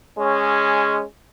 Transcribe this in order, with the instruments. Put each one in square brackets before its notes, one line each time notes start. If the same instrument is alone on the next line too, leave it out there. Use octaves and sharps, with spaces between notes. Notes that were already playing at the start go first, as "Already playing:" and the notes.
[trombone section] G#3 C#4